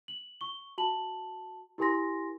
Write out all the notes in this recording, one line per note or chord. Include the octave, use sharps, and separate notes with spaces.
F#7
C#6 G7
F#4 A5 F#7
E4 G4 A#4 G#5 C6 A#6